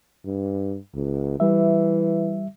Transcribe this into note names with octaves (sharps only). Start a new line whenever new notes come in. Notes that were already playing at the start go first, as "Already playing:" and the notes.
G2
C#2
E3 G3 E5